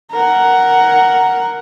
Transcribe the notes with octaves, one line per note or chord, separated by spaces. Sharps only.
A#4 F#5